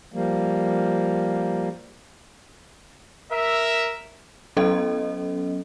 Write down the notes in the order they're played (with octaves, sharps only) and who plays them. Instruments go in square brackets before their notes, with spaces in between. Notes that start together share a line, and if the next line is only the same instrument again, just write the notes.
[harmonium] F3 G3 A#3
[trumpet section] A#4 E5
[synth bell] F#3 B3 C#4 A4 D#5